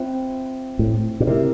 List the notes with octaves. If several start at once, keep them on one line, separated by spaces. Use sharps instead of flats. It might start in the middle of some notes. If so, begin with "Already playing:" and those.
Already playing: C4 F4 C5 E5 G5
A2
A#2
C3 A3 C4 E4 A#4